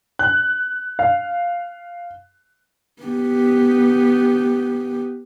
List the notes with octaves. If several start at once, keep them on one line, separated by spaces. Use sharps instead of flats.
F#6
F5
B3 G4